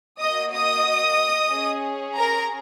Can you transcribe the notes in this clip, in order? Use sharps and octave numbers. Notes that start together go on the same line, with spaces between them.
A#3 F#4 D#5 D#6
D#5 D#6
C#4 G#4
A#4 A#5